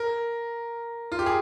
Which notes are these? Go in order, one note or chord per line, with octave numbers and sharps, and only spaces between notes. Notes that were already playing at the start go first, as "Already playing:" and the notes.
Already playing: A#4
F4
G4
G#4